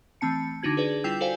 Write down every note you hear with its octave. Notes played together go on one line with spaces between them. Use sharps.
E3 A3 C4 A5 C#7
D3 D4 D#4 F#4 G#6
G#4 B4 D5
G3 E4 F4 G5 E6 G6
F#4 A4 C5 D5 F5 G#5